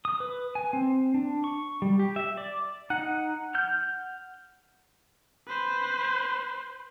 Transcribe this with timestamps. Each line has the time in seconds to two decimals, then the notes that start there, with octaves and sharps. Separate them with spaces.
0.05 D#6
0.20 B4
0.55 G#5
0.73 C4
1.14 D4
1.44 C#6
1.82 G3
1.99 G4
2.16 E5
2.37 D5
2.90 D#4 F#5
3.55 F6 G6
5.47 B4 C5